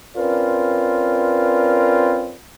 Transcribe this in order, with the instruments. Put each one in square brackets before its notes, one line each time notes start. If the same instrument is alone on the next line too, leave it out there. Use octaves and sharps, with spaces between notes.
[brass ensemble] C4 C#4 F4 A#4 B4 D5